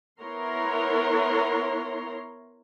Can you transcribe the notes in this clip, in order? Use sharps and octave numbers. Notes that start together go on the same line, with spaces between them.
B3 E4 A#4 C#5 A#5 C6